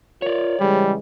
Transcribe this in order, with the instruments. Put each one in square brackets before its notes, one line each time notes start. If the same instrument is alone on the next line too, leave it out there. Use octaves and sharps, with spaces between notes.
[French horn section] F4 A#4 [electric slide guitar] C#5 D5
[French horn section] C#3 E3 G#3 [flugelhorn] G3